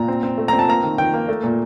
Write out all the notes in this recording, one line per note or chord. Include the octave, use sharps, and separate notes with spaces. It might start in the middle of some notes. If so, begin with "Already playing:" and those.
Already playing: A#2 A#5
C4
C4
A3
C4 A#5
A5
A#3 A#5
D#3
D#3 G5
A#3
A3
A#2